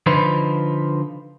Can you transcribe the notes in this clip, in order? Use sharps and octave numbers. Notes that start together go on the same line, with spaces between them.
D3 F3 D#4 F4 B4 C5